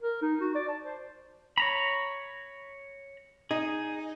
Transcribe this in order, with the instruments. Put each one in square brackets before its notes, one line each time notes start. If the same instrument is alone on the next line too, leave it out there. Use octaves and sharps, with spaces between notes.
[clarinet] A#4
D#4
F#4
D5
A5
C5
[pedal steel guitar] C#5 A#5 B5
[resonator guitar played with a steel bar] D#4 [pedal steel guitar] G#4